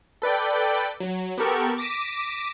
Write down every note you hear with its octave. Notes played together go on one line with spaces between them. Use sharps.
A4 B4 D5 G5
F#3
B3 G4 A4 A#4 C#6
D6 A#6 B6 D#7 E7